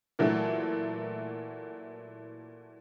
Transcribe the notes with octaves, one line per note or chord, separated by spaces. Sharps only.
A#2 E3 F#3 A3